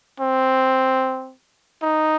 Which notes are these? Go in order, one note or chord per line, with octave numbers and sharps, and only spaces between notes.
C4
D#4